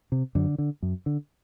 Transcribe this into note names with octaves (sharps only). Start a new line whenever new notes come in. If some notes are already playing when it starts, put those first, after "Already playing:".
C3
F#2 D3
D3
F#2
D3